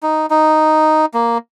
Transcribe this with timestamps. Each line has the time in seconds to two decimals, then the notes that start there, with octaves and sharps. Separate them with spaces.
0.03 D#4
0.30 D#4
1.14 A#3